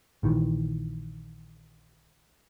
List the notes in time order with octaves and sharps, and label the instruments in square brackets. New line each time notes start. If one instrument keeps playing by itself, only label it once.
[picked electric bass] A#1 D#3 E3